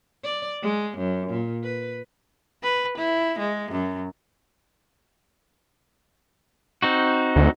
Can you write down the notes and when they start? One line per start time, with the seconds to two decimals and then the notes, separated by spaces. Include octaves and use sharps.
0.24 D5
0.62 G#3
0.97 F#2
1.29 A#2
1.63 B4
2.63 B4
2.97 E4
3.39 G#3
3.72 F#2
6.82 C4 D#4 F#4
7.36 D2